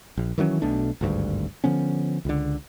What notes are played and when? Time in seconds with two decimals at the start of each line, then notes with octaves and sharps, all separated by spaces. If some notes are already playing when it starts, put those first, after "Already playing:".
0.17 A#1
0.38 D#3 E3 F#3 C#4
0.62 B1 B2 A3 D4
1.01 G#1 D2 G2
1.64 D3 F3 B3 C#4
2.25 C#2 D3